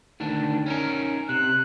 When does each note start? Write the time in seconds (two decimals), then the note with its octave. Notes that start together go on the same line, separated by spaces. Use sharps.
0.20 D2 D#3 D4
0.66 C#4 D#4 A#4
1.29 C3 F#6